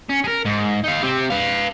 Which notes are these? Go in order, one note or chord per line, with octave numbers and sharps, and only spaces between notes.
C#4
G#4 A#4
G#2
D#4 F5
C4 G4
B4 F5